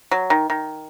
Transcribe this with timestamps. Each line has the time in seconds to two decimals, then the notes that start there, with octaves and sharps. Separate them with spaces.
0.11 F#3
0.30 D#3
0.50 D#3